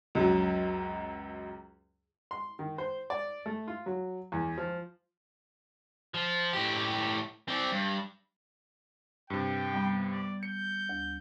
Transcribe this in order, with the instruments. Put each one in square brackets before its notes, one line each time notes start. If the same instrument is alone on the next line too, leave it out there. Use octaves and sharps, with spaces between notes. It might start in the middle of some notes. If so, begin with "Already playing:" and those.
[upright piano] C#2 F#2 F#3
[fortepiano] C6
D#3
C5
D5
A3
F4
F#3
E2
F3
[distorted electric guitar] F3
A2 G4
C4 D5
G2
[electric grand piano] G2 C3 [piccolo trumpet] G5
[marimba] G3 B3
[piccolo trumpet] D5
[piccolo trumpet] G6 [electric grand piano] C#7
[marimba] D2